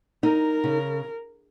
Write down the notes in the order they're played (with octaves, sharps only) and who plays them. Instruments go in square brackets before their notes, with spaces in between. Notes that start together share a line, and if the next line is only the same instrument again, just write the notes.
[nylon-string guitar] D#4 [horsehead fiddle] A#4
[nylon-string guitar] C#3